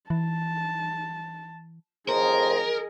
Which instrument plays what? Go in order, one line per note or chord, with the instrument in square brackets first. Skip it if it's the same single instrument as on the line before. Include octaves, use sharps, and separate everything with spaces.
[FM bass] E3 [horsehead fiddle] A5
[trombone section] F2 A2 C5 [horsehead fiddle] G#4 D#5 [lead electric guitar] A#4